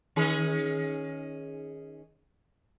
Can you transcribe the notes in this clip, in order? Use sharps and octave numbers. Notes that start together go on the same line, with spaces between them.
D#3 C#4 G#4